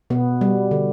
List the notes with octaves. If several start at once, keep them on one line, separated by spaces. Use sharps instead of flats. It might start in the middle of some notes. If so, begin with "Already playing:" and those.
B2 B3
G3
D3